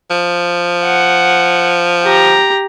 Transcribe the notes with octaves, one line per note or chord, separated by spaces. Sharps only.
F3
F#5
G4 A#5